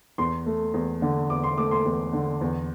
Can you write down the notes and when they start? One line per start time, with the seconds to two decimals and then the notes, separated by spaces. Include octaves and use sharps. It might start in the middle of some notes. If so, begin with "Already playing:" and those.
0.18 E2 C6
0.46 A3
0.74 E2
1.02 D3
1.30 E2 D6
1.44 C6
1.58 A3 D6
1.71 C6
1.85 E2
2.13 D3
2.41 E2